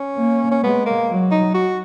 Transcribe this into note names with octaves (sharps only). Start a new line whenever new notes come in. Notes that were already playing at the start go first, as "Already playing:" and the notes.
Already playing: C#4
A#3
C#4
G#3 B3
A#3
F#3
D#4
F#4